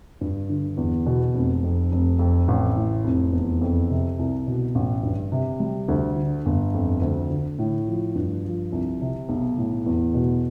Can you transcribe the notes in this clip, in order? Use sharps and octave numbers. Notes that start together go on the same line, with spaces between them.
G2
D3
E2
B2
F1
F2
F1
F2
A1
A2
F1
E2
F2
C3
C2
B2
A1
G2
C3
G3
D2
D3
G1
F2
D2
D3
A2
F3
G2
F3
C2
C3
B1
A2
E2
B2